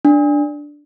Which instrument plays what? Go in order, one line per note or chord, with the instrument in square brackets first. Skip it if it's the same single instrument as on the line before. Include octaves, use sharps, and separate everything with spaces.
[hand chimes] D4